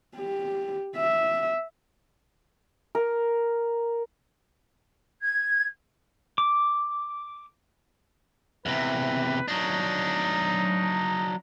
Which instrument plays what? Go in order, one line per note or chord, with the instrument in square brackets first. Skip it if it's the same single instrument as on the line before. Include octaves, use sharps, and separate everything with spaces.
[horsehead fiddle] G4
E5
[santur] A#4
[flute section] G#6
[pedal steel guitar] D6
[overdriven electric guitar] E2 C3 [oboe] B4
[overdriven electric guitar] F#3 D4 [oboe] D#4